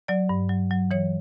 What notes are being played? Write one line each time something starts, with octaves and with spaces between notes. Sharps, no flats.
F#3 D5
G2
F#3
F#3
E3 C#5